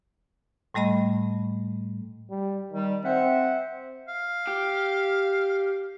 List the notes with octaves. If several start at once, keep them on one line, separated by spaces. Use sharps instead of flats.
A2 G3 A3 D#5 B5
G3
D#3 G3
C4 C5 E5 F#5
F5
G4